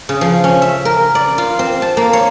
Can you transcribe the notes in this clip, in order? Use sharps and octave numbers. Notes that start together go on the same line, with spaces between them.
C#3
F3
C#4
E5
A#4
D5
F4
C4
A5
A#3
C#5